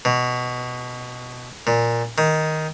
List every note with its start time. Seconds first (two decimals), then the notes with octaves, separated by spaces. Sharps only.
0.05 B2
1.67 A#2
2.18 D#3